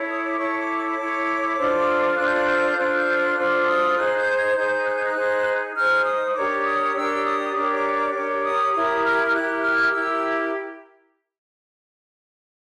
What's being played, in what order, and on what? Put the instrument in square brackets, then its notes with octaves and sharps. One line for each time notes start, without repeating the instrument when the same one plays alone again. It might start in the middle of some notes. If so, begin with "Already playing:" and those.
Already playing: [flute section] E4 A4 C#5
D#6
D6
E4 A4 C#5 C#6
D6
D6
E4 A4 C#5
D4 F4 A4 C5
D4 F4 A4 C5 F#6
G6
F#6
G6
D4 F4 A4 C5 F#6
G6
F#6
D4 F4 A4 C5 D6
D#6
D#4 G#4 C5 F#6
G6
G#6
D#4 G#4 C5 G6
F#6
G6
F#6
D#4 G#4 C5
D#4 G#4 C5 F6
D#6
D4 G4 A#4 C#5 D6
D#6
D4 G4 A#4 C#5 E6
D#6
D4 G4 A#4 C#5 D6
D6
D6
D4 G4 A#4 C#5 D6
D#6
E4 G4 A#4 D#6
F6
F6
E4 G4 A#4 F#6
F6
E4 G4 A#4 E6